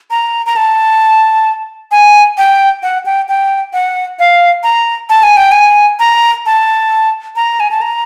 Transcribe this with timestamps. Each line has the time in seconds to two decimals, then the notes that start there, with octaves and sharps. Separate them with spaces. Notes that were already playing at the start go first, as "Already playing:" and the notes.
0.11 A#5
0.46 A#5
0.56 A5
1.91 G#5
2.38 G5
2.83 F#5
3.06 G5
3.28 G5
3.73 F#5
4.19 F5
4.63 A#5
5.09 A5
5.23 G#5
5.37 G5
5.52 G#5
5.99 A#5
6.46 A5
7.36 A#5
7.60 G#5
7.71 A5
7.81 A#5